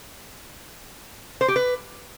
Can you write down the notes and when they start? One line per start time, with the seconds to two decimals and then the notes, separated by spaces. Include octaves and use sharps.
1.41 C5
1.48 G4
1.56 B4